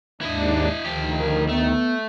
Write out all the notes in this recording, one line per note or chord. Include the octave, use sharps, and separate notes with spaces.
D#2 G#2 D4 E4 D#5
D2 D#3 F3 G4
A#4
A3 B3